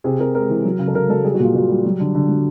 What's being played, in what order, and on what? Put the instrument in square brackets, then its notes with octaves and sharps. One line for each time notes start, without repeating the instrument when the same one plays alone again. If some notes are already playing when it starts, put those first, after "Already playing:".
[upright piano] C3 G#4
C3 A#4
G#3 A#4
E3
F#3
C#3
A4
C#3 A#4
F#3 A4
G3 G#4
F#4
A#2
F4
A#2 F#4
G3
F#3
D3
D3
F#3